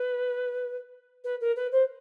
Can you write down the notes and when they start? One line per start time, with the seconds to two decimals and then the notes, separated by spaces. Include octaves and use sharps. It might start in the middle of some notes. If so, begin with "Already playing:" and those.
Already playing: B4
1.24 B4
1.40 A#4
1.56 B4
1.71 C5